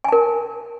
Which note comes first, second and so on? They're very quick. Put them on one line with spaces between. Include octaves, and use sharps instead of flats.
G#5 A5 A#4